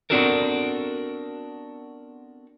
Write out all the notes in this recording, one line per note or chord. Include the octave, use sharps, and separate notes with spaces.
B3 C4 D4 F#4 A4 A#4